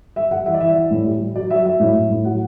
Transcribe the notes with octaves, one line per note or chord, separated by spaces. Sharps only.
G3 E5
G3 F#5
E3 E5
D5
E3 E5
E3
A2
G3
G3
F#3 D5
F#3 E5
F#3 E5
A2
A2
A2
F#3 F#5